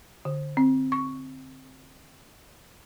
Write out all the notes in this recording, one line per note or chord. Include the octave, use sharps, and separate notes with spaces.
D3
C4
C#6